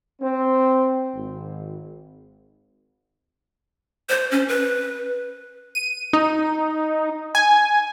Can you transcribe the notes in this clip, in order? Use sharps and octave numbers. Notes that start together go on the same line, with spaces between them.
C4
G#1
C5
C#4
B4
D#7
D#4
G#5